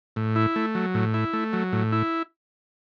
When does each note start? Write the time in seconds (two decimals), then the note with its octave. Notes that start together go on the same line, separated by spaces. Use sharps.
0.16 A2
0.36 E4
0.56 A3
0.75 F#3
0.94 A2
1.14 E4
1.33 A3
1.53 F#3
1.72 A2
1.92 E4